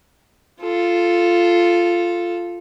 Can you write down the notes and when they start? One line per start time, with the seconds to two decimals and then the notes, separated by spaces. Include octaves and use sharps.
0.61 F4 A4